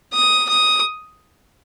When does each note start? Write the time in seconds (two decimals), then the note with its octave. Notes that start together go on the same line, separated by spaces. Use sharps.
0.14 D#6
0.49 D#6